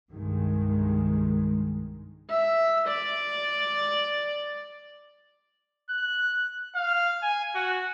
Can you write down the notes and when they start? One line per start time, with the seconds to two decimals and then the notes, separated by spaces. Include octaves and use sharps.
0.13 C2 G2 D#3 G#3
2.30 E5
2.87 D5
5.90 F#6
6.75 F5
7.22 G#5
7.55 F#4